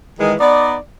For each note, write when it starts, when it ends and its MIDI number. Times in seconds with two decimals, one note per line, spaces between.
0.19 0.33 51
0.19 0.33 52
0.19 0.33 56
0.40 0.75 59
0.40 0.75 63
0.40 0.75 74